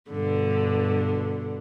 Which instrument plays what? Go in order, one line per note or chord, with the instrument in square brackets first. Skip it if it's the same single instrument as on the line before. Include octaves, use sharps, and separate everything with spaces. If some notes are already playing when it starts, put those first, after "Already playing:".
[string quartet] G2 B2 D3